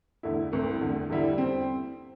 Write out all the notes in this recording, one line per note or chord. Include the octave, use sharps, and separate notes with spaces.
E2 D3 A3 E4
C2 C3 A3
E2 D3 A3
E2 D3 G3 E4
C4